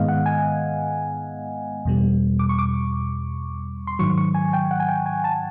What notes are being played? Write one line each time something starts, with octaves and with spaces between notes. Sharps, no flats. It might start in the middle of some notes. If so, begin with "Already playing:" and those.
Already playing: G#2 D#3 G#3 B3 D#5 F5
F#5
G#5
E2 B2 G3
D6
C#6
D6
C6
G#2 D#3 F#3 C#6
C#6
G#5
G5
F#5
G#5
G5
G#5
A5